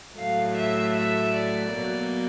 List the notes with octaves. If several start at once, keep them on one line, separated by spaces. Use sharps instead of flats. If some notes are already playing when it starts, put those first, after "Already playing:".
A2 F#3 A3 F5
E5
E5
D5
B2 F#3 A#3